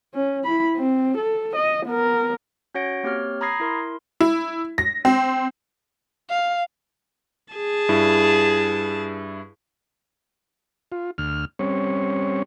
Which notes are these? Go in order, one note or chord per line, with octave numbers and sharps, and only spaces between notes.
C#4
E4 B5
C4
A4
D#5
B3 A#4
C#4 F#4 C#5 F#5 A#6 D7
A#3 C4 G4 C#5 F6
A#5 B5 D#6 G#6 A#6 C7
E4 A#4 C6
E4
A#6
C4
F5
G#4 A5
G2 E4
F4
D2 F6
G3 C4 C#4 C#5